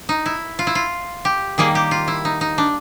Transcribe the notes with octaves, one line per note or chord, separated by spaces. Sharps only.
D#4
E4
F4
E4
F4
G4
D#3 G3 A#3 G#4
G4
F4
E4
D#4
D#4
D4